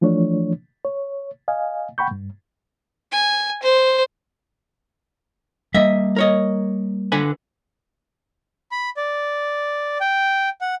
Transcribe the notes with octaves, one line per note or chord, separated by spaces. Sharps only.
E3 F3 A3 D4 C#5
C#5
D#5 F5 G#5
F#5 G5 B5 C#6 G6
G2
G#5
C5
G3 A#3 D#5 E5
A#4 C#5 D#5
D3 B4 G#5
B5
D5
G5
F#5